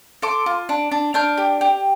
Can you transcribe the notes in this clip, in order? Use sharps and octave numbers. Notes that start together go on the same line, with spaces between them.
A4 C6 D6
F4
D4
D4
D4 F6 G6
G4
G4